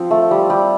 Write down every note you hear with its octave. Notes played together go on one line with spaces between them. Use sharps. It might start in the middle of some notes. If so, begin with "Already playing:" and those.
Already playing: F3 C4
A3
G3
G3